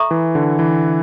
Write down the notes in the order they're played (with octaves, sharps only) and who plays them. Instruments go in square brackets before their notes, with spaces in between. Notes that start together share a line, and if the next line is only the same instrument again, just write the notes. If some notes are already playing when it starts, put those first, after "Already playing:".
Already playing: [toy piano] A4 E5 A#5 C#6
[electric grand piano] E3
D3
E3